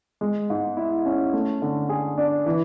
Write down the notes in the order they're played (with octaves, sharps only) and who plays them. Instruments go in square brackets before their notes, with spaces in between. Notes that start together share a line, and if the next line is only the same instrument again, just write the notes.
[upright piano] G#3
G#2
E4
C#4
A3
D3
G#4
D4
E3